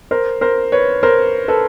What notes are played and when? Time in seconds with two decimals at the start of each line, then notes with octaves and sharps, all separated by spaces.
0.11 A#4 C5
0.41 A#4 C5
0.72 B4 C#5
1.03 A#4 C5
1.48 A4 B4